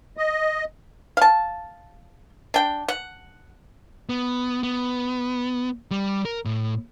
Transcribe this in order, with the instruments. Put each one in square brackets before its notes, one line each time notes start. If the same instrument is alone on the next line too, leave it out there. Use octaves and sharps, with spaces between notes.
[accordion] D#5
[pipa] F5 A5
D4 G5
F#5
[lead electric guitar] B3
B3
G3
A#4
A2